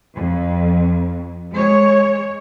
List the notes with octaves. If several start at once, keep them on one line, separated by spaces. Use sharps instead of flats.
F2
G#3 C#5